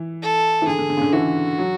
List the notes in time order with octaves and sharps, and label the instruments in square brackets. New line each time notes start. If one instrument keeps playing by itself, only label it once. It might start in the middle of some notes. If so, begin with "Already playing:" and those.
Already playing: [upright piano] E3
[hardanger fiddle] A4
[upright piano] E3
[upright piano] D3 [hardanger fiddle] G#4
[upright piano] D3
D3
C#3
D3
[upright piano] E3 [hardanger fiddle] F#4
[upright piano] F#3